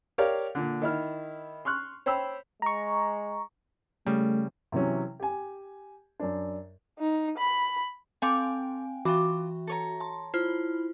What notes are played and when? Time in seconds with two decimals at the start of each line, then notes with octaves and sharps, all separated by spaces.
0.18 G4 A#4 C#5 D5 F5
0.55 A#2 D3
0.82 D#3 E4 F6
1.65 C6 C#6 F6 F#6
2.06 C5 C#5 G5 B5 E6
2.62 G#3 A#5 C#6
4.07 C#3 G3 A3
4.72 C3 E3 F#3 C#4
5.20 G4 G#5
6.20 F#2 D4
6.99 D#4
7.38 B5
8.22 C4 A4 F5 G5 G#5 D6
9.05 E3 F4 F#4 E5 G5 D6
9.67 A4 C#5 A#5
10.00 A5 C6
10.34 E4 F4 C5 F6